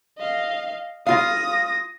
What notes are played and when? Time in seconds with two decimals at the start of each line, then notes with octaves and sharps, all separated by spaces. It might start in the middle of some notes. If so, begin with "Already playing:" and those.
0.18 D#5 F5
1.07 F4 F5 D#6 A#6